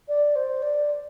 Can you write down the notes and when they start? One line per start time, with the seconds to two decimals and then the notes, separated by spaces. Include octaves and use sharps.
0.08 D5
0.36 C5
0.62 D5